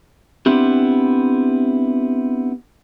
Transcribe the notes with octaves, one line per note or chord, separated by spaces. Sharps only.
B3 C4 D4 E4 G4